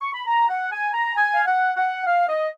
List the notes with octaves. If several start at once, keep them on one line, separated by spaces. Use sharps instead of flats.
C#6
B5
A#5
F#5
G#5
A#5
G#5
F5
F#5
F#5
F5
D#5